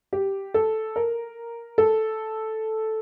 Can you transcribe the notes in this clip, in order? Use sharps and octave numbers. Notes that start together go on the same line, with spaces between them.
G4
A4
A#4
A4